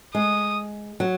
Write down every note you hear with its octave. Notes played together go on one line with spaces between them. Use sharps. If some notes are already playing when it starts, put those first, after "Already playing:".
G#3 D#6
F#3